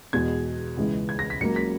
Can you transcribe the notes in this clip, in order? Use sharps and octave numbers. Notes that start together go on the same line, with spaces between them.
E2 B2 G#3 G#6
C#2 C#3 E3 G#3
G#6
A#6
B6
C#2 C#3 F#3 A#3 C#7
B6